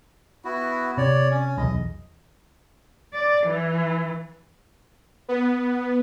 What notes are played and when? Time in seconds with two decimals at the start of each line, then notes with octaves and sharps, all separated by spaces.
0.45 B3 E4 F#4
0.98 C3 C#5 D5
1.31 C#4
1.58 B1 E2 D#5
3.14 D5
3.46 E3
5.29 B3